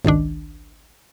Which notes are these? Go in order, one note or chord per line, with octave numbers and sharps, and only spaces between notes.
G#1 C#2 D#3 D4